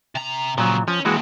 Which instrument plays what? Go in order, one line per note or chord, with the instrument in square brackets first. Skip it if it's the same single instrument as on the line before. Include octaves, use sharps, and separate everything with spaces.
[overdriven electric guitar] C3 A#5
[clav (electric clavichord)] A#2 F#3 [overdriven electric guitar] C#3 F3
[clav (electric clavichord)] F3 [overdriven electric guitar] C#4
[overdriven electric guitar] D#2 A#2 [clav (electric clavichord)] E3 G#3 F#4